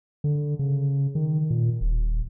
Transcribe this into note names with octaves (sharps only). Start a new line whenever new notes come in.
D3
C#3
D#3
A#2
D#1